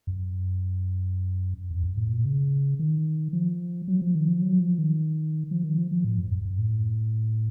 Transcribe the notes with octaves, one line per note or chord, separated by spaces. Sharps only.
F#2
F2
F#2
A2
A#2
C#3
D#3
F3
F#3
F3
D#3
F3
F#3
F3
D#3
F3
D#3
F3
F3
A2
F#2
F#2
F#2
A2